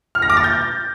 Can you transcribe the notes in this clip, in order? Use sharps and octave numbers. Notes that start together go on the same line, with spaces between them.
F6
A#6
D6
A6
G6